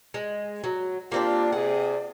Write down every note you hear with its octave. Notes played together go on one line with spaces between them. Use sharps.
G#3
F#3
A#3 C4 D4 F4 G4 D5
C3 G#4 F#5